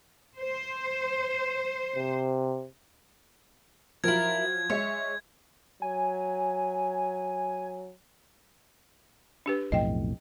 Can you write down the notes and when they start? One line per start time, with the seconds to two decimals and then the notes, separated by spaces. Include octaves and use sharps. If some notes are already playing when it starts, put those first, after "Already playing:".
0.38 C5
1.96 C3
4.04 F3 F#3 E4 F4 A#4 G#6
4.70 G#3 C#5 E5
5.82 F#3 G#5
9.46 D4 G4 B4
9.72 B1 F2 A2 D#5 G5